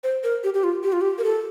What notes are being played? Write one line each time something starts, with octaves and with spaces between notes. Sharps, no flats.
C5
A#4
G4
G4
F4
G4
F4
G4
A#4
A4